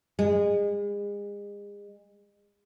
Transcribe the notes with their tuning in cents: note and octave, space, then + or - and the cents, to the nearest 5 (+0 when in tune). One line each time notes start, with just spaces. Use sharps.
G#3 -35